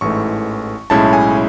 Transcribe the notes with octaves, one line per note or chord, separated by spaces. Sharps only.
A1 G#2 E3 A3 C#6
B1 A2 G#3 C#4 E4 A5
G#5